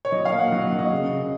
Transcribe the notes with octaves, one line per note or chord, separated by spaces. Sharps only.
C#5
F#3 D#5
F5
A#2
F#5
F#3
F#3
D#5
C#3
C#3